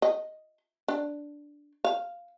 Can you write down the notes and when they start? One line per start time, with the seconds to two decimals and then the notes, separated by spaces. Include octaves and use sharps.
0.02 D#5
0.88 D4
1.84 F5